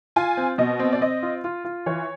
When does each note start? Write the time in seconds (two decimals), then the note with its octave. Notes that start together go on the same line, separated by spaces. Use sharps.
0.16 F4 G#5
0.37 C4
0.58 B2 D#5
0.79 C4
0.93 D5
1.01 C4 D#5
1.23 F4
1.44 F4
1.65 F4
1.86 E3 C#5